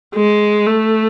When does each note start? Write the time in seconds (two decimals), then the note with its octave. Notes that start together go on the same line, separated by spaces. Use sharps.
0.15 G#3
0.67 A3